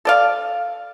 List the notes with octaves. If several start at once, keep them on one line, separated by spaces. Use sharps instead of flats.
A4 D5 F5